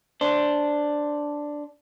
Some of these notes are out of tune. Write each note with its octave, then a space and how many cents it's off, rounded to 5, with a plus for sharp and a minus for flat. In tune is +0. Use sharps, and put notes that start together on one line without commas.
D4 +0 C5 +0